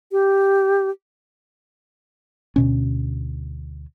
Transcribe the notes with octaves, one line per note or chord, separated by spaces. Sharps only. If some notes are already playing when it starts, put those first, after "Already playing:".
G4
D2 B2 C#4